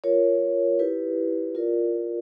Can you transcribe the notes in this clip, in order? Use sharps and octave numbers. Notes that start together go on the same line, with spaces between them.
F4 A#4 C#5
E4 G4 B4
F4 A#4 D5